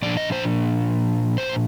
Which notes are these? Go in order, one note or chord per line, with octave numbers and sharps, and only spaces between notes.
A#2 F3 D4 D5
D#5
C5
C5